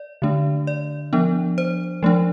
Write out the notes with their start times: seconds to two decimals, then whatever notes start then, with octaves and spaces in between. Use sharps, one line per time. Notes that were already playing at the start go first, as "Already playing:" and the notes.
Already playing: D5
0.22 D3 A3 D4
0.67 D5
1.13 F3 B3 D4
1.58 C5
2.03 F3 A3 D4